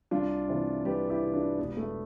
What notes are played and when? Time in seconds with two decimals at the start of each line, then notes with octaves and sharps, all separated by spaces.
0.11 C2 D4 F4
0.49 C3 E3
0.85 C2 G4 B4
1.10 E4 G4
1.21 C3 E3
1.34 D4 F4
1.59 E1 B3
1.77 A3